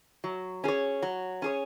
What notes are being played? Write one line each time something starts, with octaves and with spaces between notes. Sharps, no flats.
F#3
C#4 G#4 C#5
F#3
C#4 G#4 C#5